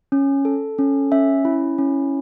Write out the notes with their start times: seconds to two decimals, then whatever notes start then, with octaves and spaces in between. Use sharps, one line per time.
0.12 C#4
0.45 A4
0.78 C#4
1.12 C#4 E5
1.45 E4
1.78 C#4